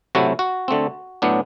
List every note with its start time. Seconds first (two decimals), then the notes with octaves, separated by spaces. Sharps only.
0.15 C3 F#3 A3 E4 F#4
0.39 F#4
0.68 D3 A3 C4
1.22 A2 F#3 B3 D4